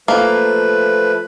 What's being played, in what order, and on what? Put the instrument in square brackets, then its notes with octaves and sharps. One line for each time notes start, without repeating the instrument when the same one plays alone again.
[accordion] F3 A3 B4 [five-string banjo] A#3